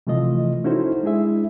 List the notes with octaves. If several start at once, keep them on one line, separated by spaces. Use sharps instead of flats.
C3 E3 F3 A3 F4 D#5
C#4 D#4 E4 F#4 A4 C5
G#3 D4 E4 G#4 E5